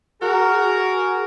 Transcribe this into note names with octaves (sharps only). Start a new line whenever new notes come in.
F#4 G#4 A#4